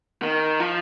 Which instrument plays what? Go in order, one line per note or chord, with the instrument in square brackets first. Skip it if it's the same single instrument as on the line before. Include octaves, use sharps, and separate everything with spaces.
[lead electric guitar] D#3
F3